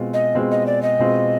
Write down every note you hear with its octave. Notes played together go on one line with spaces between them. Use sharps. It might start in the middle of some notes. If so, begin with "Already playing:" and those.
Already playing: B2 G#3 C4 F4
D#5
B2 G#3 C4 F4
D#5
D5
D#5
B2 G#3 C4 F4